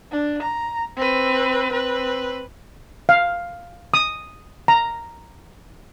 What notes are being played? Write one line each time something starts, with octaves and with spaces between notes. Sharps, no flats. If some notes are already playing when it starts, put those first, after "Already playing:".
D4
A#5
C4 B4
C4 B4
F5
D#6
A#5